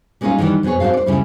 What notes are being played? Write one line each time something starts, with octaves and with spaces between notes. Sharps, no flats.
G3 G#3 B3 C#4 D#4 F4
D#3 E3 G3 B3 D4
F2 B2 B3 G#4 C#5
G#2 C4 F#4 A4 F5
C5 D5
D2 C#3 G3 E4